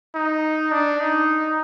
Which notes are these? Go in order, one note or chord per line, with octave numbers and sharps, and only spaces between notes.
D#4
D4
D#4